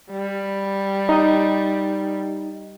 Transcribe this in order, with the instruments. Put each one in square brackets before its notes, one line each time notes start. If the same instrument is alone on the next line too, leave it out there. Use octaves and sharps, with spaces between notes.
[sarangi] G3
[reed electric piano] D#4 D#5